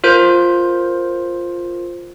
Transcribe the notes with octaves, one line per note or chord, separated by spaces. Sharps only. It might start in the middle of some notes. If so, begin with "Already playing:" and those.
F4 A#4 C5 G6